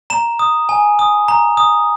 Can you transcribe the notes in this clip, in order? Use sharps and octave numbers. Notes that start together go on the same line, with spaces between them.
A#5 E7
D#6
G#5
D#6
A#5
D#6